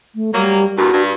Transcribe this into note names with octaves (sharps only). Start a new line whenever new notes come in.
A3
F#3 G3 A#3
E2 G2 A#2 F#4
G2